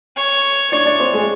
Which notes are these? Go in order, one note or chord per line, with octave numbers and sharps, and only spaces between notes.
C#5
D4 C#5 D5
D4 D5
C4 C5
G#3 G#4